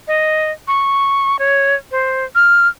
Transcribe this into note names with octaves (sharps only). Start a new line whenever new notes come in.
D#5
C#6
C#5
C5
F6